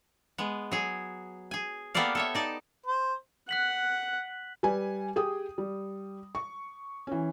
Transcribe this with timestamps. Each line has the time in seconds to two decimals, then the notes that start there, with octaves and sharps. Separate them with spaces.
0.38 G#3 B3
0.71 F#3 G#4
1.51 G#4 G#5
1.94 A#3 B3 G4 A4 D5 F5
2.15 A4 C#5 E5
2.35 D#4 D5 A5
2.86 C5
3.49 F#5 F#6 B6 F#7
4.63 G3 B4 G#5
5.16 G4 G#4 G5 D#6
5.58 G3
6.35 C#6
7.07 E3 C#4